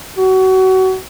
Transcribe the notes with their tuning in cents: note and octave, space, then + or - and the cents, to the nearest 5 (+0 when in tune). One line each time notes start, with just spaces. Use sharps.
F#4 +30